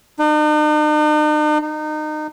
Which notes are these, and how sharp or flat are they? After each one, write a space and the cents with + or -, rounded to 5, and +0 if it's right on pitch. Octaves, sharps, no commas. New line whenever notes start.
D#4 -45
D#4 -30